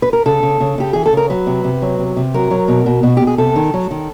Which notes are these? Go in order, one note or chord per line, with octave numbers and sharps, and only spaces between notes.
B4
A#4
C#3 A4
C#3
C#3
C#3 G4
E3 G#4
A4
C#3 A#4
F#3 B4
C3
C3
F#3
C3
C3
F#3 A#4
F#3
B2
B2
B2 F#4
B2 G4
G#4
C3 A4
D#3
F#3
D#3